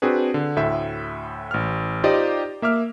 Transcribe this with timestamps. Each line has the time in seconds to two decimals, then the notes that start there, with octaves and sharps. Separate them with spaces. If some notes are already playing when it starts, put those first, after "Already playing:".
0.02 C4 D4 F#4 G#4 B4
0.34 D3
0.56 D2 A2 E5
1.51 A1 F6
2.03 D#4 F4 G4 C5 D5 D#5
2.62 A#3 E5 D6 F6